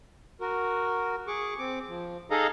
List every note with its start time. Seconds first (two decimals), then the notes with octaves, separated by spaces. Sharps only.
0.41 F#4 A#4
1.27 G#4 C#6 D6
1.59 C4 D6
1.88 F3
2.31 D#4 G#4 A4 D#5 F5 A#5